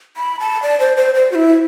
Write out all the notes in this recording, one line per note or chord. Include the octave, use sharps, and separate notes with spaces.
B5
A5
D5
C5
C5
C5
F#4
E4